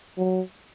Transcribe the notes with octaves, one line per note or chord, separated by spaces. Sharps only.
F#3